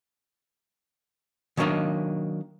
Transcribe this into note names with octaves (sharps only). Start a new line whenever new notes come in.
D#3 F#3 G3 A#3 D4 D#4